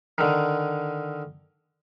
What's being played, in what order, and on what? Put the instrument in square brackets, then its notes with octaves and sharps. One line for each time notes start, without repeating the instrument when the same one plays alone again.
[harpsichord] D3 D#3